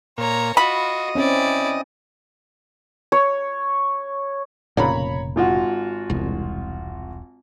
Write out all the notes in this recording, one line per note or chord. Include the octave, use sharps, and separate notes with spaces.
A#2 C#5 A#5
F4 F#4 D#5 B5
C4 C#4 E4 D5
C#5
F1 A#2 C#3 C#5 A#5 B5
G#1 F4 F#4
E1 C2